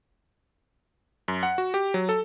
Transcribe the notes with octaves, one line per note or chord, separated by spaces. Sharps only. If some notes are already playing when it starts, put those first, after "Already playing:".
F#2
F#5
F#4
G4
F#3
A4